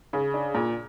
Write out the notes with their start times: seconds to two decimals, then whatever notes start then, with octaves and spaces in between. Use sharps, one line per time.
0.13 C#3
0.34 D4
0.54 A#2